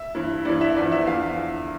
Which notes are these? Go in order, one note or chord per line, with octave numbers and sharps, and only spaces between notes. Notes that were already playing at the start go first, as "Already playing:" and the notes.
Already playing: E5
G2 E3
G2 E3 D5
E5
E2 D3 F3 D5
E5
E2 D3 F3 F5